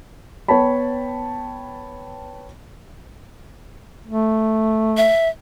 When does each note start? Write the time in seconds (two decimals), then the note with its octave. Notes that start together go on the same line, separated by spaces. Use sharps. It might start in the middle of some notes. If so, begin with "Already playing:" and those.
0.48 B3 C#5 G5 A5 B5
4.07 A3
4.97 E5